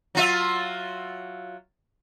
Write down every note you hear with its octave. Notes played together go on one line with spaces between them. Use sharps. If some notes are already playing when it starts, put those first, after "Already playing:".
F#3 F4 E5